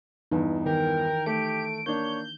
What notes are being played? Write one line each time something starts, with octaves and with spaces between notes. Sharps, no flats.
E2 G2 E3 D#4
D#3 A#4 G5
A3 G4 D7
A#3 D4 C#5 G6